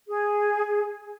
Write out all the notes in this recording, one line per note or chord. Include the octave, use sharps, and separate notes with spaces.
G#4